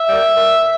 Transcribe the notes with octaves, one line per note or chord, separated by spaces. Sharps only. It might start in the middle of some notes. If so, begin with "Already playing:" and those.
Already playing: E5
G3 A#3
A#2